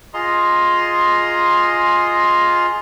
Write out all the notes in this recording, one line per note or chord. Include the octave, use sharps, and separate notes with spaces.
F4 G#4 D#5 A#5 C6